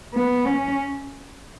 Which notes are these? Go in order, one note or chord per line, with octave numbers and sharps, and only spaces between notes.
B3
C#4